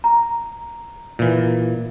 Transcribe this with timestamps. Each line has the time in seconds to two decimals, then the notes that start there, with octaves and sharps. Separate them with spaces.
0.04 A#5
1.19 A#2 E3